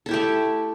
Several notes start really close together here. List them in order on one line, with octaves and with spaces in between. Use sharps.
A4 E4 G4 A3